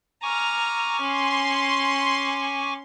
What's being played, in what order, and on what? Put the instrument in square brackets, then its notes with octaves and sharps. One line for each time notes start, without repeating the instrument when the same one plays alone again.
[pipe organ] G#5 C#6 D6 [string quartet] A#5 F6
[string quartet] C#4 [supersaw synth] C6